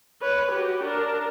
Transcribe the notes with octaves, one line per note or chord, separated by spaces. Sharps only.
B4 C#5
F#4 G4
D4 A#4